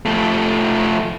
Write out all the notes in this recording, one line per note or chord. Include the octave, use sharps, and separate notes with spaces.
F3 A3